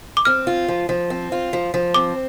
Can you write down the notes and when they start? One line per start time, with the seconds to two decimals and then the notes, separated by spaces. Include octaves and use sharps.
0.17 D6
0.25 C4 F6
0.47 F4
0.68 F3
0.89 F3
1.10 C4
1.32 F4
1.53 F3
1.74 F3
1.94 C4 D6